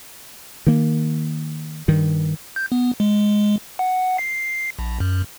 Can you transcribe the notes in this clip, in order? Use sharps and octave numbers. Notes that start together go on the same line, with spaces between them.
D#3 A#3
G2 D#3
G6
B3
G#3
F#5
C7
A#1
F#2